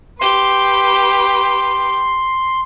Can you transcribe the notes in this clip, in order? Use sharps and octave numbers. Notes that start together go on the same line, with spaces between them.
G4 B4 C6